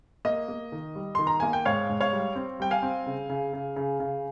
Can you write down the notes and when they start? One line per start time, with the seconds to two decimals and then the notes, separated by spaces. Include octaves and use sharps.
0.25 A#3 D#5
0.48 A#3
0.72 D#3
0.95 G3
1.15 D#3 C6
1.27 A#5
1.40 A#3 G#5
1.53 G5
1.65 G#2 C#5 F5
1.89 G#2
2.01 C#5 F5
2.13 G3
2.36 C4
2.60 G3 G5
2.71 F5 G#5
2.83 C4
3.06 C#3
3.29 C#3
3.53 C#3
3.76 C#3
4.00 C#3